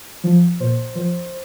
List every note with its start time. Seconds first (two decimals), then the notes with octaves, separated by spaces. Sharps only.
0.24 F3
0.60 A#2 C5
0.95 F3 C5